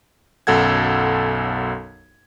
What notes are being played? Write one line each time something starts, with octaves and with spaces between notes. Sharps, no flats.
B1 F#2 A4 F#5 G#6